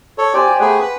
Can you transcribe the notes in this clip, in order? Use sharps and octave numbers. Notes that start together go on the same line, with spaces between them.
A4 C#5
G4 C5 D5 G#5
G4
A3 G#4 F#5 B5
B4